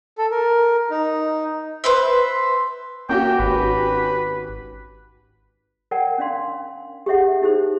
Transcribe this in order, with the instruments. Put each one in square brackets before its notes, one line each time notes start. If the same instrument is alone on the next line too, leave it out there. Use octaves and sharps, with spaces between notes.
[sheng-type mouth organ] A4
A#4
D#4
[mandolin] B4 C5 E5
[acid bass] A#3 [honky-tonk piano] C#4 F#4 G4 [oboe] G5
[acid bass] G#1 [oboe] B4
[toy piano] A#4 C#5 D5 F#5 G5 A5
C#4 D4 D5 F5 C6
G4 G#4 C#5 E5 F#5
D#4 E4 G4 G#4 C5